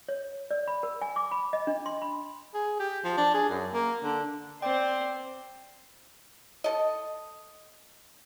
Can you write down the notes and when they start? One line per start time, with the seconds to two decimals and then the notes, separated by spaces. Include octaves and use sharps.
0.08 C#5
0.51 D5
0.68 B5
0.83 A#4
1.02 G#5
1.16 D6
1.32 B5
1.53 D#5
1.67 D4
1.86 C6
2.02 B5
2.54 G#4
2.80 G4
3.04 F3
3.17 D4
3.34 G#4
3.50 F#2
3.73 A#3
4.03 D3
4.62 C4 C5 D5 G5
6.64 A4 D#5